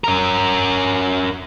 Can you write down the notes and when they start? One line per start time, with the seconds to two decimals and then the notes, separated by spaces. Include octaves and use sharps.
0.04 C#4 A#4